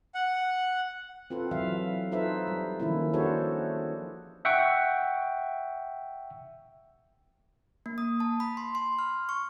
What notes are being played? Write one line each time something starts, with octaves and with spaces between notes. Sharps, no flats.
F#5
C4 F4 A4 B4
E3 F#3 E5 F5
D#4 F4 A4 B4 C5 E5
G3
D#3 F3 A#3 C#4 E4
D4 F#4 G#4 A4 C5 C#5
E5 F#5 G5 C#6
A#3
D#6
A5
B5
C6
C6
F6
C#6